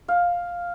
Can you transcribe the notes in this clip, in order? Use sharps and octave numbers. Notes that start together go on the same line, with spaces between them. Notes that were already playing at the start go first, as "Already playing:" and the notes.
F5